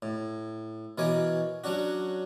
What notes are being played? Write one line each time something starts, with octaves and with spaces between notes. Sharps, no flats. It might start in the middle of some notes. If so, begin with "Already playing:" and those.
A2
B2 E3 A#4 C#5 G#5 D6
F#3 C#4 D4 F#4